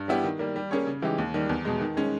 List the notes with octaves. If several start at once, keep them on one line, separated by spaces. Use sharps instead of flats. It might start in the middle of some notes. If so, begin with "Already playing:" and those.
Already playing: G2
G3 B3 E4 G4
D#3
G3 A#3
G3
A#3 C#4 G#4 C#5
C#3
E3 G#3 D#4 G4
D#2
D#3 G3
E2
B2 G#3
D#3
G#3 C#4